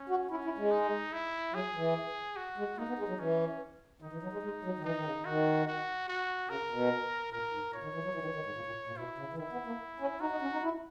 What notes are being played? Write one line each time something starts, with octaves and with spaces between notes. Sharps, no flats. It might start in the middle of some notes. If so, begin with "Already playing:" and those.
Already playing: C#4
F#4
C#4 E4
E4
G#3
D#4
E4
F#3 G#4
E3
F#4
G#3
A#3 D#4
B3
G#3
F#3
E3 C#4
D#3 D#4
E3
F#3
G#3
G#3
F#3
D#3
E3 D#4
D#3
C#3
D#3 F#4
F#4
F#4
C#3 A#4
B2
A#2 A#4
G#2
A#2 C#5
D#3
E3
F#3
E3
D#3
E3
D#3
G#2
A#2
A#2
A#2
B2 E4
C#3
E3
D#3 E4
B3
A#3
C#4
D#4 F#4
D#4
C#4
D#4
E4